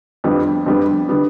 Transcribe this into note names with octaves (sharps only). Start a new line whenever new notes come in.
F2 D3 G3 B3
F2 D3 G3 B3
D3 G3 B3